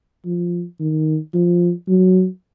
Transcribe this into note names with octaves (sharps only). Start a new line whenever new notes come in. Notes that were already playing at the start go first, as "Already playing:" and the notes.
F3
D#3
F3
F#3